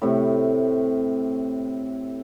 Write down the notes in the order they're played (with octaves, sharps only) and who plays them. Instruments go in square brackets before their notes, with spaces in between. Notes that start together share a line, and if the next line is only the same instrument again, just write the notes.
[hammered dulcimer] A2 C3